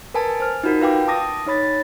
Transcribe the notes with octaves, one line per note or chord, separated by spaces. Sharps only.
A#4 B4 G#5 A5
C5 F6
D#4 F4 F#4 A#4
F4 B4 F5 G5 D6
A5 D6 D#6 A#6
D#4 C#5 B5 A6